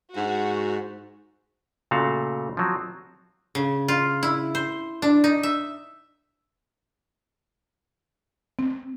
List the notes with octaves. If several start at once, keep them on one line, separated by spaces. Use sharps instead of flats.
G#2 F#4
A#2 C#3 A3 F#4 F5
F3 F#3 C4
C#3
F4
E4
C5
D4
D#4
E5
C4